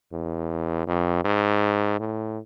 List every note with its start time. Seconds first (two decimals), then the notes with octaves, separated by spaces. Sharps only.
0.13 E2
0.87 F2
1.25 G#2
2.00 A2